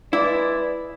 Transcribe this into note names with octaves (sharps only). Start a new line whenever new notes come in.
G#3 E4 B4 D5